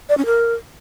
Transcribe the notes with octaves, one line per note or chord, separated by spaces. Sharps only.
D5
C#4
A#4